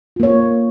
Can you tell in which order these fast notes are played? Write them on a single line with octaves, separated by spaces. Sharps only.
F4 A#3 C#5